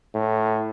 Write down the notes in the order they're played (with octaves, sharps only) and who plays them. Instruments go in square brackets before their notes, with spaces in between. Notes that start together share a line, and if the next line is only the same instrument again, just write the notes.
[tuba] A2